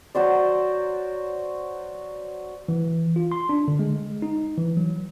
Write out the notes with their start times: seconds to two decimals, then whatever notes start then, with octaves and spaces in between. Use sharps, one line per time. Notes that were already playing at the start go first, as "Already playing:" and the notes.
0.15 F#3 F#4 C5 D5
2.68 E3
3.16 F4
3.32 C6
3.49 D4
3.68 D3
3.79 G#3
4.22 D#4
4.58 E3
4.77 F#3